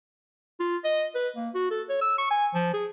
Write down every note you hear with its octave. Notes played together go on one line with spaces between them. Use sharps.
F4
D#5
B4
A#3
F#4
A4
C#5
E6
C#6
G#5
F3
G#4